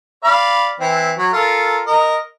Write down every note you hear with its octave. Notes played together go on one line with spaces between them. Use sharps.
D5 F5 B5
E3 C4
F#3
F4 A4 A#4
A#4 D#5